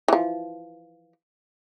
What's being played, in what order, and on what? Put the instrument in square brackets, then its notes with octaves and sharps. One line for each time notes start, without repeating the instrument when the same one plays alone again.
[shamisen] E3 F3